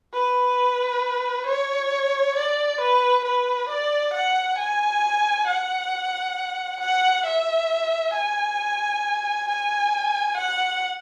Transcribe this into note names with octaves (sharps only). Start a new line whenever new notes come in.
B4
C#5
D5
B4
B4
D5
F#5
G#5
F#5
F#5
E5
G#5
G#5
F#5